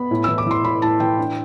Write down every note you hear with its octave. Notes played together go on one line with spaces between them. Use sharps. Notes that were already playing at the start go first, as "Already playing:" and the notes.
Already playing: B3 B5
A2
E3 E6
D6
E3 C6
A2 B5
A2 A5
E3 G5
D4